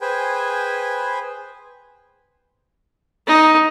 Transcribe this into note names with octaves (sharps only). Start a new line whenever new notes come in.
G#4 B4 C5 G5 G#5
D#4